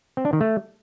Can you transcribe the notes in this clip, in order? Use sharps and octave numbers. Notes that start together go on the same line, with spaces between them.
C4
D4
D#3
A3